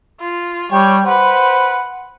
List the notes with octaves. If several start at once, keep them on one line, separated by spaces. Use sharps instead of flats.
F4
G3 C#5 G5
B4 C5 F#5